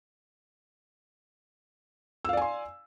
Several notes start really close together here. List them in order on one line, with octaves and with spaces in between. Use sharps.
E6 F5 D5 G#5 C6